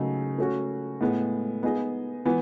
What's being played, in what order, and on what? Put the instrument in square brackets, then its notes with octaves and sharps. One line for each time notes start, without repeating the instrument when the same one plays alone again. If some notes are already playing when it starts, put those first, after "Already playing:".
Already playing: [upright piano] C#3 F#3 A3 D#4 A4
A3 C#4 F#4
A2 G#3 B3
B3 D#4 G#4 D#5
E3 B3